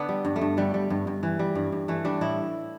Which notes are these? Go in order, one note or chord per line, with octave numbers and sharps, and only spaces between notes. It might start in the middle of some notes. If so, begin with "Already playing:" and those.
Already playing: D3 B3 D4
G3
G2
A3
G2
D3 G3
G3
G2
G2
E3
G3
G2
G2
E3 A3
G3 D4
A2 E4